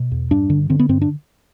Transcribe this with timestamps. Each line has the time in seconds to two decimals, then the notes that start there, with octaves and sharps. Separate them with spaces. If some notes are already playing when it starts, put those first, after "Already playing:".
Already playing: B2
0.11 E2
0.31 G2 D4
0.50 D3
0.70 D3 C4
0.79 B3
0.89 G2 C4
1.01 D4